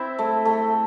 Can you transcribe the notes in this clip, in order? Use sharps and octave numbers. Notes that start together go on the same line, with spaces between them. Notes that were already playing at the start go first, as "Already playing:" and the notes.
Already playing: C4 E4
A3
A3